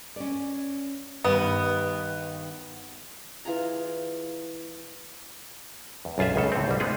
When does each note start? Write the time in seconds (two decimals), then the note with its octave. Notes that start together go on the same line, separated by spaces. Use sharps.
0.16 C#4 D5
1.24 G2 D#3 B3
3.45 E3 F4 G#4 A#5
6.05 E2
6.18 B1 F#2 F4 G#4 E5
6.36 C#2 C#3 A4
6.52 A2 C4
6.68 C2 G3
6.80 G#3 B3 D#4 F4 G#4